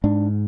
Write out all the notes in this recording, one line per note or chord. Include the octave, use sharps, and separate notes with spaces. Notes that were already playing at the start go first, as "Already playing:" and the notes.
G#2 D4